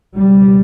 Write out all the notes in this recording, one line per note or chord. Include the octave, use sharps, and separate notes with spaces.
C#2 B2 G3